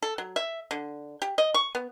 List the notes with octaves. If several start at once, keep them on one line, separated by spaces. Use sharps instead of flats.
A4
F#3
E5
D3
G4
D#5
C#6
B3